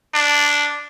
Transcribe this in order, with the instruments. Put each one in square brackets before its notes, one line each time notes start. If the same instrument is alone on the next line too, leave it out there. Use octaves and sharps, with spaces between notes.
[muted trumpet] D4